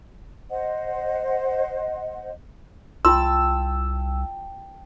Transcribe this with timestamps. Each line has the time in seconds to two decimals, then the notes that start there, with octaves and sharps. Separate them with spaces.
0.50 C5 D#5 F#5
3.05 C2 F4 G5 A5 C6 E6